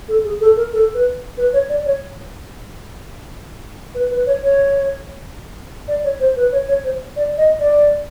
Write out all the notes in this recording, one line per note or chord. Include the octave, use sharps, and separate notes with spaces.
A4
G#4
A4
A#4
A4
B4
B4
C#5
D5
C#5
B4
B4
C#5
C#5
D5
C#5
C5
B4
C#5
C#5
C5
D5
D#5
D5